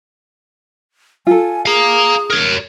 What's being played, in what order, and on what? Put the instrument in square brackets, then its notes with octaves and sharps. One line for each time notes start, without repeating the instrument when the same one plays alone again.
[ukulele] F4 A4 [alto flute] G#5
[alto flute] G#4 [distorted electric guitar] F5 A#5
[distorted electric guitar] A#4 C#5